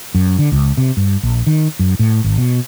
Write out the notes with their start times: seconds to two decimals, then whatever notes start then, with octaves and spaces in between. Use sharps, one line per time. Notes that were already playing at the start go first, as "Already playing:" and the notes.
0.15 F#2
0.39 D3
0.52 C#2
0.77 C3
0.97 G2
1.23 A#1
1.47 D#3
1.79 F#2
1.99 A2
2.24 G#1
2.38 B2